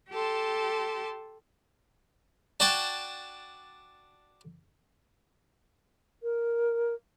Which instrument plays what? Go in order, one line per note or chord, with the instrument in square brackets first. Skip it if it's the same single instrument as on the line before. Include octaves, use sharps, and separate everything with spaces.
[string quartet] G4 A4 A5 C6
[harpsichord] D4 F#4 F#5 G5 A5
[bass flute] A#4